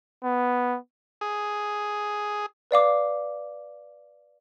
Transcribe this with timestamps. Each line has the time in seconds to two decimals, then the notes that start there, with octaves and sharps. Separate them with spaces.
0.24 B3
1.21 G#4
2.71 B4 D5 F5 D6